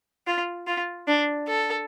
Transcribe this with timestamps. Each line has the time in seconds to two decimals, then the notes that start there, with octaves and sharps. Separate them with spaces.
0.27 F4
0.67 F4
1.08 D4
1.48 A4